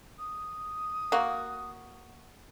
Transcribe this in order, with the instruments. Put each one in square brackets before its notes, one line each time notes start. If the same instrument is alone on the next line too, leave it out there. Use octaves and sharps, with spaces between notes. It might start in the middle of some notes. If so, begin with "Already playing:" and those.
[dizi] D#6
[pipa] A#3 F#4